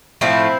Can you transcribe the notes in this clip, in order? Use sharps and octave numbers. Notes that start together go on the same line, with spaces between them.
A2 F3 A3 C4 E4